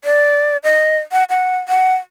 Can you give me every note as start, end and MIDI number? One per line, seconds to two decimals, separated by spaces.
0.04 0.57 74
0.64 0.99 75
1.12 1.24 78
1.30 1.58 78
1.69 1.95 78